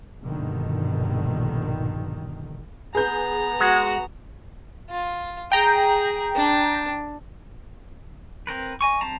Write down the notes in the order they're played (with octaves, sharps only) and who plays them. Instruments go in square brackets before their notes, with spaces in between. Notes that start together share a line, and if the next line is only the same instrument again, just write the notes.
[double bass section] A#1 G2 B2 D3 D#3
[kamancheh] B3 A#5 [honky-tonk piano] G#4 B4 G6
[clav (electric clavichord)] G#3 [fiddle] F#4
[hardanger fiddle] F4
[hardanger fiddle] G#4 [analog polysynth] G5 A#5
[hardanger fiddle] D4
[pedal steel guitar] C4 A#4 B4
D#5 G#5 C#6
G3 C4 A5 A#5